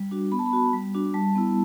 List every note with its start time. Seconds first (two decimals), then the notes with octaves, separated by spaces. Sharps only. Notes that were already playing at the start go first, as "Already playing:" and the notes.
Already playing: G3
0.11 D4 F#4
0.32 B3 B5
0.39 A5
0.46 B5
0.53 F#4
0.73 G3
0.94 D4 F#4
1.14 G3 A5
1.35 B3 E4